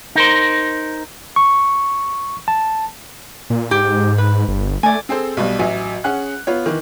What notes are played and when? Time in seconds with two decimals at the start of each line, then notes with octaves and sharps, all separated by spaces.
0.16 D#4 A#4 C5
1.36 C#6
2.48 A5
3.50 A#2
3.71 G#2 G4
4.18 B4
4.48 G1
4.83 A3 D5 G#5
5.09 C4 G#4 A4 C5
5.37 B1 B2 G3
5.59 A1 F#3 E5 G#5
6.04 C#4 G#4 F#5 F#6
6.47 B3 F4 C#5
6.66 D#3 E3